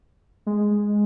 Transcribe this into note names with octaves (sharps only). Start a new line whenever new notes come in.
G#3